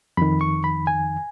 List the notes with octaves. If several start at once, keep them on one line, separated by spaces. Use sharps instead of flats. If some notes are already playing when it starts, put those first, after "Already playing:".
F2 D#3 B5
C#6
B5
G#5